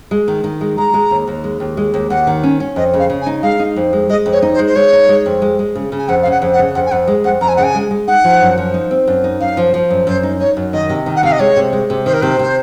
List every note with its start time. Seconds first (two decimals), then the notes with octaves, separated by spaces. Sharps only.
0.11 G#3
0.28 D#3
0.44 D#3
0.61 G#3
0.77 G#3 A#5
0.94 G#3
1.11 D#2
1.27 D#2
1.44 G#3
1.60 D#2
1.77 G#3
1.94 D#2
2.10 D#2 F#5
2.27 D#3
2.43 C#4
2.60 C#4
2.76 F2 D#5
2.94 C#3
2.99 F5
3.10 C#3
3.21 G#5
3.26 D#4
3.43 G#3 F5
3.60 D#4
3.76 F2
3.93 G#3
4.09 G#3 D#5
4.26 F2
4.32 C#5
4.42 D#4
4.54 C5
4.59 G#3
4.67 C5
4.76 G#3 C#5
4.93 D#4
5.09 G#3
5.26 F2
5.42 G#3
5.59 G#3
5.75 C#3
5.92 C#3
5.98 G#5
6.08 F2 F#5
6.22 C#3 F5
6.31 F#5
6.42 F2
6.53 F#5
6.59 C#3
6.75 F2 F#5
6.86 G#5
6.91 F2 F#5
7.08 G#3
7.24 F2 F#5
7.41 F2 A#5
7.48 G#5
7.56 C#3 F#5
7.63 G#5
7.75 G#3
7.91 G#3
8.07 D#4 F#5
8.24 F3
8.41 F#2
8.58 F3
8.74 D#4
8.91 C4
9.07 F#2
9.24 D#4
9.40 F#2 F5
9.57 F3
9.74 F3
9.90 F#2
10.07 F#2 C5
10.23 D#4
10.40 D#4 C#5
10.57 F#2
10.73 D#3 D#5
10.89 C3
11.06 D#3
11.16 F#5
11.23 C3 F5
11.32 D#5
11.40 G#3 C#5
11.56 C3
11.73 G#3
11.90 C3
12.06 D#3 C5
12.14 A#4
12.22 C3 C5
12.39 C3